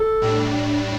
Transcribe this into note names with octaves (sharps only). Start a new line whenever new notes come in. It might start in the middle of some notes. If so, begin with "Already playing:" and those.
Already playing: A4
A2 G3 D4